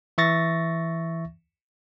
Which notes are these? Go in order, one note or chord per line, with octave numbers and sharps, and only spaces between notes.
E3 E5 C#6 A6 A#6